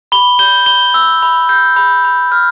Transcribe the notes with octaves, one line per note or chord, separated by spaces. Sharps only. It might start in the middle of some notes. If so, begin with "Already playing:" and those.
B5 G7
G6 G7
B5 G7
E6
B5
G6
B5
B5
F6